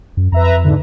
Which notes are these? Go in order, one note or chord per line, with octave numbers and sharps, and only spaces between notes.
F#2
F2 B4 E5 A#5
G#2 D3